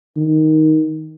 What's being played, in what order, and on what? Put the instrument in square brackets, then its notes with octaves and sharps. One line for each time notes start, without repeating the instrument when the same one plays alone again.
[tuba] D#3